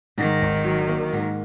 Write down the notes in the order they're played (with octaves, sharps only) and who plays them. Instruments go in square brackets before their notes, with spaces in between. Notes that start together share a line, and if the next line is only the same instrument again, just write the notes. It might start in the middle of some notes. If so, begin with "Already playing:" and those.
[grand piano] G#2 [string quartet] D#3
[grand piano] G#1
F#3
A#3
G#2